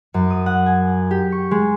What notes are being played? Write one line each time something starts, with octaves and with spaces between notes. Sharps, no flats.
F#2
D#6
F#5
G#5
G4
C#6
G#3